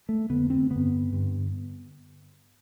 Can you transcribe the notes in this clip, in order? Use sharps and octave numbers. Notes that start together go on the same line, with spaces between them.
A3
F2 D3 B3
C4
G2 D3 B3
G2 D3